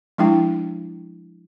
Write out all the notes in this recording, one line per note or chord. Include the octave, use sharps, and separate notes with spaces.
F3 G#3 D4 E4 G5